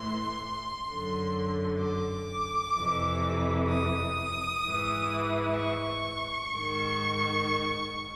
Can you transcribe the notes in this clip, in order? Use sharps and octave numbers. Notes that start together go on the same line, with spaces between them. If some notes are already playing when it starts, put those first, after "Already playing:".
Already playing: A2 E3 C6
F#2 D3
D6
F2 C3 E3
D#6
G#2 E3
C#6
G#2 D#3